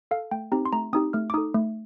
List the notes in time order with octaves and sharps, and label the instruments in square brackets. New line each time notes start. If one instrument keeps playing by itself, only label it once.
[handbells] A4 F5
A3 G5
C4 D#4 G4 A#5
C6
A3 A#5
C4 D#4 G4 D#6
A3 F6
D6
D#4 A4 D#6
A3